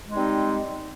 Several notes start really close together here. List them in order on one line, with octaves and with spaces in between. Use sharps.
G#3 D#4 C4 G3